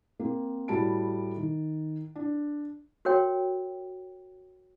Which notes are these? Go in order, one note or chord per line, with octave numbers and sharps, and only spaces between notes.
A#3 C4
A2 G3 F#4 A5 B5 D7
D#3
D4
F#4 A#4 C#5 G5